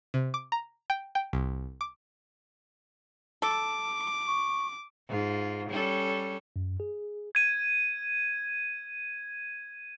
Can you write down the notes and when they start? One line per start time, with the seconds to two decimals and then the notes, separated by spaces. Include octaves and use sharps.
0.14 C3
0.34 D6
0.52 A#5
0.90 G5
1.15 G5
1.33 C2
1.81 D6
3.42 A4 D6
4.27 C#6
5.08 G#2 F4
5.70 G3 C#4 A4
6.56 F#2
6.80 G#4
7.35 G#6 D#7